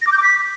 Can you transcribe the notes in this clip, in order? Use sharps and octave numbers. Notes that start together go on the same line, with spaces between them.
A#6
D6
G6
D6
B6